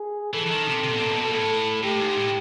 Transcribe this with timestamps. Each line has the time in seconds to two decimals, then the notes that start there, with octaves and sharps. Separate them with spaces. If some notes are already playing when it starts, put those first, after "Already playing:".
Already playing: G#4
0.33 E3 A4
0.46 E3
0.51 D#3
0.67 C3
0.83 C3
0.93 B2
1.02 A#2
1.11 B2
1.33 A2 A4
1.83 A2 G4
1.99 G#2
2.16 A2